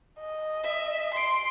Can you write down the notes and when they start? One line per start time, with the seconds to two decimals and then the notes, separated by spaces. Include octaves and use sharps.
0.19 D#5
0.64 E5
1.14 C6 C7 D7